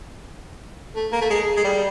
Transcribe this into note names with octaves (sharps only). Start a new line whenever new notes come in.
A3
A#3
A3
G#3
G#3
G3